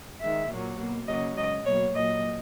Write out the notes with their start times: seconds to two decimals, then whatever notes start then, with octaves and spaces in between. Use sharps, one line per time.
0.21 D#3 G#3 E5
0.50 A#2 F#3 A#3
0.78 B2 A#3
1.07 C#3 F#3 A#3 D#5
1.37 C#3 G#3 D#5
1.65 B2 F#3 A#3 C#5
1.94 A#2 F#3 A#3 D#5